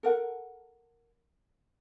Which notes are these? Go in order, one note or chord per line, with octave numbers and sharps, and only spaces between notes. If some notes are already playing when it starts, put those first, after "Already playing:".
A4 A#4 F#5